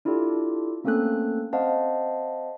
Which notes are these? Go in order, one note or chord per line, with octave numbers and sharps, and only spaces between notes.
D4 E4 F4 G4 A4 D5
A3 A#3 C4 C#4 A4 F#6
C4 C5 D#5 F5 F#5 A5